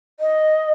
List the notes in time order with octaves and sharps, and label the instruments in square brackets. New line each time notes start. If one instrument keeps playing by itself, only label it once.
[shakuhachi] D#5